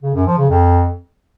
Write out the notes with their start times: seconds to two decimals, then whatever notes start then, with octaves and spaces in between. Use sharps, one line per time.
0.02 C#3
0.14 F#2
0.26 F3
0.38 C#3
0.50 F2